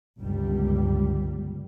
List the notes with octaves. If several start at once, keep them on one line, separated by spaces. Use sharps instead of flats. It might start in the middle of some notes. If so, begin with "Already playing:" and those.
G1 C#2 G3